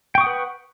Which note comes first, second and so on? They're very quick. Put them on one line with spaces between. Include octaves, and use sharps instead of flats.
G5 C#6 D#6 F#5 B4